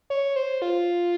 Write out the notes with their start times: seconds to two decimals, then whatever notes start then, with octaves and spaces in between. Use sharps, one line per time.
0.10 C#5
0.36 C5
0.62 F4